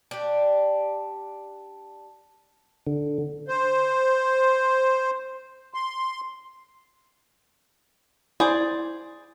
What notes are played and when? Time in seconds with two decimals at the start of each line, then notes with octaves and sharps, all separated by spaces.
0.11 D4 G4
2.87 D3
3.48 C5
5.74 C6
8.40 E4 G#4 C5 D5